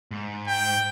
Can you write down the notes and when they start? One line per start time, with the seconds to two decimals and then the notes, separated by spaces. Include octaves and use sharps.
0.11 G#2
0.47 G5